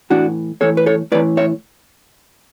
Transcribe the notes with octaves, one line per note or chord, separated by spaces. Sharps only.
A2 E3 D4 F#4
A2 E3 A4 C#5
B4
A4 C#5
A2 E3 B4 D5
C#5 E5